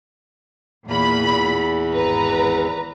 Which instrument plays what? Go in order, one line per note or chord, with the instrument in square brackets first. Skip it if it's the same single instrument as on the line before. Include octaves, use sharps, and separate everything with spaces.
[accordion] E2 [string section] A#2 B5
[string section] G#1 B4 A#5